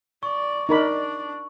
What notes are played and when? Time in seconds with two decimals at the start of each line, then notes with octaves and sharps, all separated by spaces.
0.23 D5 C#6
0.69 D4 D#4 A#4 D5 B5